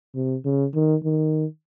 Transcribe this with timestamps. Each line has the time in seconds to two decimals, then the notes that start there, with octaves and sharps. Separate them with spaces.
0.15 C3
0.45 C#3
0.74 D#3
1.04 D#3